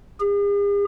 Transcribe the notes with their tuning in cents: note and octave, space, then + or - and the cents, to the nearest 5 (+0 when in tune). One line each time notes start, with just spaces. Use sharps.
G#4 -45